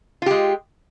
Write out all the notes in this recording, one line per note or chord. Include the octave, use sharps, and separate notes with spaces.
G#3 F4 G4